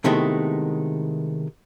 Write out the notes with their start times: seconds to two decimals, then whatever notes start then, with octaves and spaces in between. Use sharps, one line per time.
0.04 C3 D#3 G#3 A3 B3 E4